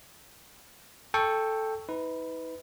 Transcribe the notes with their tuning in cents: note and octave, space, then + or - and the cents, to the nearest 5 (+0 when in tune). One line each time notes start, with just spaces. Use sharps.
A4 +0 G5 +15 C#6 +0
D#4 +45 B4 +15